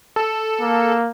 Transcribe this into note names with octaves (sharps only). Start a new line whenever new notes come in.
A4
A#3